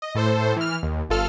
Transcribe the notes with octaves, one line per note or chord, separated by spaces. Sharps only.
D#5
A2 A4 C5
E3 F6
D#2
G1 F4 A4 F6